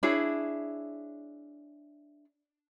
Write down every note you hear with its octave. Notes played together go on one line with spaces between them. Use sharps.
D4 E4 G#4 C#5